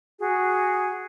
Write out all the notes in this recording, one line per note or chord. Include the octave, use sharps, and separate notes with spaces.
F#4 G#4